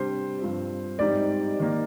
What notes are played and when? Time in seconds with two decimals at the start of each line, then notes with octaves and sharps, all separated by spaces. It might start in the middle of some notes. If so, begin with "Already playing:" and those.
Already playing: C3 G3 D4 C5
0.39 G2 F3 C4
0.99 G#2 G3 C4 D#4 D5
1.60 D#3 A#3 D#4